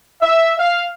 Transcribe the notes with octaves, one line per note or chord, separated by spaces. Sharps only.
E5
F5